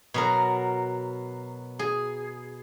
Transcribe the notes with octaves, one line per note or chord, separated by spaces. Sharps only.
B2 F#3 A#4
G#4